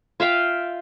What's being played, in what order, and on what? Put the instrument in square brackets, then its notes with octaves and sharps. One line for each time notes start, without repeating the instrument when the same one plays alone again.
[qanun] F4 E5 F5 G5